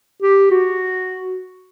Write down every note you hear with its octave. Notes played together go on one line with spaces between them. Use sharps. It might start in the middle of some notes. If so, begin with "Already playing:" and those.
G4
F#4